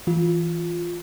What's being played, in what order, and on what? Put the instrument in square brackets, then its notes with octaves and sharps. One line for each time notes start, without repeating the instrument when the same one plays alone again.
[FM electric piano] E3 F4